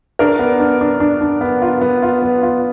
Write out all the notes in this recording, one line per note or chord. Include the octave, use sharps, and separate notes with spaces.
D4 A#4
B3
D4
D4
D4
D4
B3
F4
B3
F4
B3
F4